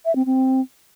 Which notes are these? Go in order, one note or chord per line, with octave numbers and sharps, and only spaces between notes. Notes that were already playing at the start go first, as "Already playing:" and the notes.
E5
C4
C4